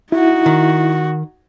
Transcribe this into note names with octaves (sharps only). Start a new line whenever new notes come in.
D#4 E4 F#4
D#3